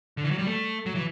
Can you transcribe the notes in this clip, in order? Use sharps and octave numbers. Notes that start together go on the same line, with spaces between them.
D3
E3
F#3
G3
A3
F#3
E3